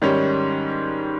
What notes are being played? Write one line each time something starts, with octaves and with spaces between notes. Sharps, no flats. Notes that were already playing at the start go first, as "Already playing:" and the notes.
G#2 D#3 G3 C#4